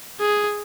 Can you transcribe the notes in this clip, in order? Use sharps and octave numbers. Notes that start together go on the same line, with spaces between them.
G#4